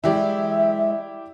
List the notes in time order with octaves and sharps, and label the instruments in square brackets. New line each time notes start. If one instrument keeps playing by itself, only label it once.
[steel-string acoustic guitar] E3 F#3 G#3 [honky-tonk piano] E4 G4 D5 [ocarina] E5